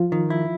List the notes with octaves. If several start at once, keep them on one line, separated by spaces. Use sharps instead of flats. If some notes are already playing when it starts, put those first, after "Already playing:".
Already playing: F3 F4
D#3
E4